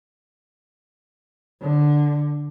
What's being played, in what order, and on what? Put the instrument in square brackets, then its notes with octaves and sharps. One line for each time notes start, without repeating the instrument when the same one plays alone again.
[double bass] D3